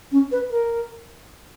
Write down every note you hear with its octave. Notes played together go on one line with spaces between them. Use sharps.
C#4
B4
A#4